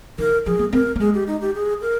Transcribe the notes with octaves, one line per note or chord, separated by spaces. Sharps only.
D#3 A#4
F3 G#4
A#3
C4 A#4
A#3
G#3 G#4
G4
D#4
G4
G#4
A#4